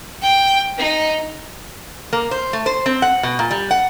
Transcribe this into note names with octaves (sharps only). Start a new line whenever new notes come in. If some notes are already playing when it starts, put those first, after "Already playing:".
G5
D#4
A#3
C5
A3
C5
C4
F#5
B2
A#2
G3
F#5